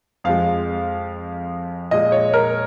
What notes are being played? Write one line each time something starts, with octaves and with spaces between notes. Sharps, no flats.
F2 F3 G#3 F5
A#2 G#3 D#5
C#5
A#4